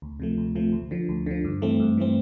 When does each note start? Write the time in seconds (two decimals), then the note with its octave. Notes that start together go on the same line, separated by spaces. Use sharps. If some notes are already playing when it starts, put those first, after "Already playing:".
0.02 D2
0.20 C3 F3 A3
0.38 D2
0.55 C3 F3 A3
0.72 D2
0.91 D3 F3
1.09 D2
1.26 D3 F3
1.44 G2
1.62 E3 A3 C4
1.80 G2
1.98 E3 A3 C4